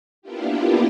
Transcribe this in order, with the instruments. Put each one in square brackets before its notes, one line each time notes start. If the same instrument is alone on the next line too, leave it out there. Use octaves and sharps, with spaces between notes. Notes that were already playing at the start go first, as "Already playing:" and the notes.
[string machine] A#3 B3 D4 E4 F4 G4